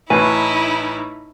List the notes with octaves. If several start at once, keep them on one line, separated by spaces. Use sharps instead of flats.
A1 A2 D#4 E4 B4 G#5